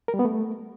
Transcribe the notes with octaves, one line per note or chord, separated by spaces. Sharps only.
A#4
G3
B3
A3